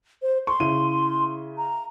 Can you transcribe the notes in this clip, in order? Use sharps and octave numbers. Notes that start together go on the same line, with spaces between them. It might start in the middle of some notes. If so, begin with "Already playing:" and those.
C5
C6 C#6
C#3 E4 D#7
A#5